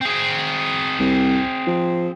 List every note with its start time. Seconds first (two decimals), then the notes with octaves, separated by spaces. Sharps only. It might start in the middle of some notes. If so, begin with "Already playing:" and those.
0.01 C4 G#4
0.99 C2
1.67 F3